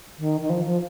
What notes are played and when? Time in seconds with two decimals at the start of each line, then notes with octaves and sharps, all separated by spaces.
0.19 D#3
0.41 D#3
0.50 F3
0.66 F3